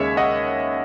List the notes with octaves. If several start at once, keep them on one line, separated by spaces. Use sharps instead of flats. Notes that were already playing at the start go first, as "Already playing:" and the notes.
Already playing: D#2 C#3 G#3 C#5 E5
D#5 F#5